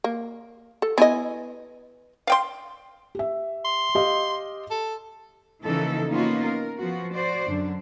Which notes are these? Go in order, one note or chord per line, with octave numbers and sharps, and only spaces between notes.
A#3
A4
B3 E4 D#5 G#5
F5 G5 C6
G4 E5
C6
G4 D#5 F5
A4
C#3 E3 F3 A#3 D#4 A4
A#3 B3 C#4 D#4 F4 F#4
A#4
F3 B3 F#4
F#4 C5 D5
F#2 D3 D4